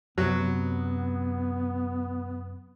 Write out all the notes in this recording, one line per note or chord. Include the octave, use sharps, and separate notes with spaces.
F#2 C3 F#3 B3